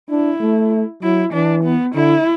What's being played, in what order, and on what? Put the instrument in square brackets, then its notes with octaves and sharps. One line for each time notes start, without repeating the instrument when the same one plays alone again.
[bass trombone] D4 [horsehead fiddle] E4
[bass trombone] A3
[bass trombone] F#3 [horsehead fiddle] E4
[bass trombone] E3 [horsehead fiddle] D4
[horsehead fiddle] B3
[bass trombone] D3 [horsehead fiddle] E4